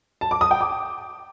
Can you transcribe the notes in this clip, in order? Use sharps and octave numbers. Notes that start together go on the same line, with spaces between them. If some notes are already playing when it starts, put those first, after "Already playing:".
A5
D6
D#6
G5
D6